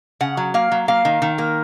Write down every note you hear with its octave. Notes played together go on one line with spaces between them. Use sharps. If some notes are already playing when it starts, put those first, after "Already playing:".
C#3 F#5
F#3
A#3 F5
F#3
A#3 F5
D#3
D#3
A#3